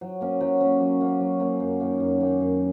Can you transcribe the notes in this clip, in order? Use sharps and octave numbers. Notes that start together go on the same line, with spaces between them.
F#3
A#3 C#4
F#3
A#3 C#4
F#3
A#3 C#4
F#3
A#3 C#4
F#2
D#3 A#3
F#2
D#3 A#3
F#2